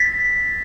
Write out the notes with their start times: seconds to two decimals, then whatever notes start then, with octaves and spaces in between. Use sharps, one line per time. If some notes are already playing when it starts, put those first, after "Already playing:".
Already playing: A6 B6